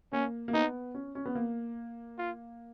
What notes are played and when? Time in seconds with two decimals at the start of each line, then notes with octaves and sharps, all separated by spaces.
0.12 A#3 C#4
0.48 A#3
0.53 B3 D#4
0.94 C#4
1.15 C#4
1.25 B3
1.35 A#3
2.18 F4